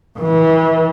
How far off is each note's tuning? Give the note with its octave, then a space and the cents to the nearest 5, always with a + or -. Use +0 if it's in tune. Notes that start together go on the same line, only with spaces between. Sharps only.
E3 -30